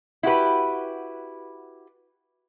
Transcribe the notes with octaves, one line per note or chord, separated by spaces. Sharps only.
E4 F#4 G4 B4